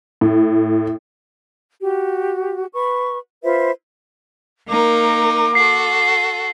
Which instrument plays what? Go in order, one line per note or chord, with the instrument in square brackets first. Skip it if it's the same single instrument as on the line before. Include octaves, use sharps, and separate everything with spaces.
[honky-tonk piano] A2
[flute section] F#4 G4
B4 C#6
F4 B4 C5 E5
[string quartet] A#3 D#4 A#4 [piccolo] D6
[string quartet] F#4 A4 [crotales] C7